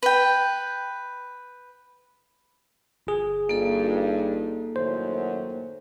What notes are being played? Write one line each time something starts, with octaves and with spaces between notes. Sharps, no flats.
B4 G5
G1 G#4
G2 A#3 D#4 F4 A4
F#2 A2 D#3 C5